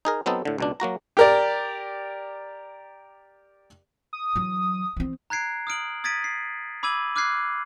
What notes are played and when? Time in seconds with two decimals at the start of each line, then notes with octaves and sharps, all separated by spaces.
0.05 D#4 G#4 A#4
0.26 F#3 B3 C4 D#4 A4
0.45 A2 D3
0.58 C#2 B2 D4
0.80 F#3 A#3 F#4 A#5
1.17 G4 A#4 D5
4.13 D#6
4.36 E3 F#3
4.97 E3 C4
5.30 A#5 F#6 G#6 C7 D7
5.67 D#6 F6 D7 F#7
6.04 D#6 G#6 A6 B6 D7 D#7
6.24 C7
6.83 B5 D6 E6 G#6 D#7 F#7
7.16 D6 F6 F#6 G#6 C7